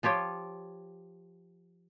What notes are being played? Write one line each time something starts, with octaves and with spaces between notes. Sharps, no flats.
F3 F4 G4 C#5